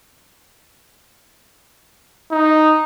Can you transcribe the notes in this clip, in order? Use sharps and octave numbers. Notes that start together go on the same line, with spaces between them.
D#4